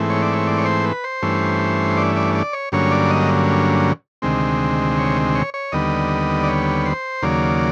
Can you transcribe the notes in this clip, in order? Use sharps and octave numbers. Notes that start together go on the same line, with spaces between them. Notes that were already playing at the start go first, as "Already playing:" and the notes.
Already playing: G#2 E3 A3 C4
C#5
D5
C#5
D5
C#5
C5
B4
C5
G2 E3 A3 C#4
D5
D5
D5
C#5
G2 D3 F#3 A#3 C#4 C#5
D5
D#5
D2 C3 D#3 G#3 C4
C#5
C#5
C#5
D#2 D3 G3 B3 D#5
D5
C#5
C5
D#2 C#3 F#3 A#3 D5